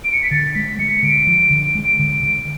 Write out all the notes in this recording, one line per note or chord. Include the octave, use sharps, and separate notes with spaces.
D7
C#7
B6
D3 A6
G#3 B6
G#3 C#7
D3 D7
F3
D3
G#3
D3
D3